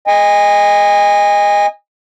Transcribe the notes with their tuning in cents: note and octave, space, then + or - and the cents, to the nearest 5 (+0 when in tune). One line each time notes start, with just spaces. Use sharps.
D#5 +0 G#5 -30